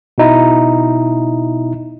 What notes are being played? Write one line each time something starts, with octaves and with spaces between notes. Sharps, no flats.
B2 D#4 E4